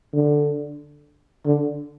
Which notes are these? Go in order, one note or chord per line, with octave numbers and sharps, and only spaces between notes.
D3
D3